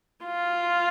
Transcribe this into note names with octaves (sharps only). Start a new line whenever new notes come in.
F4